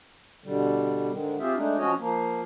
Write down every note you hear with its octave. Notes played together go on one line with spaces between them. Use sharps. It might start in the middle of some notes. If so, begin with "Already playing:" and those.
B2 D3 G3
G#2 D3 D#3
C4 F4 G4 G#4 E5
G#3 A3 D4 D#4
F3 C#4 F#4 C#5 D#5
F3 A#3